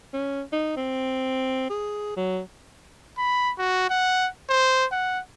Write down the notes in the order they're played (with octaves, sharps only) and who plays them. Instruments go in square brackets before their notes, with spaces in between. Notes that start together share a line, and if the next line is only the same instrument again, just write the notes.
[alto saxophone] C#4
D#4
C4
G#4
F#3
[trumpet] B5
F#4
F#5
C5
F#5